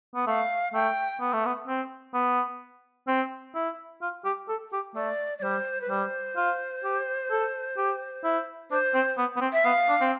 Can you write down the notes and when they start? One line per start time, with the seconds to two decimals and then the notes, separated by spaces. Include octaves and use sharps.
0.15 B3
0.27 A3 F5
0.74 A3 G5
1.20 B3
1.33 A3
1.46 B3
1.68 C4
2.14 B3
3.08 C4
3.55 E4
4.02 F4
4.25 G4
4.49 A4
4.73 G4
4.95 A3 D5
5.38 D5
5.42 G3 C5
5.81 B4
5.89 G3 C5
6.37 F4
6.84 G4
7.31 A4
7.77 G4
8.24 E4
8.71 D4 C5
8.94 C4
9.18 B3
9.36 B3
9.41 C4
9.53 E5
9.65 B3 F5
9.89 D4
10.01 C4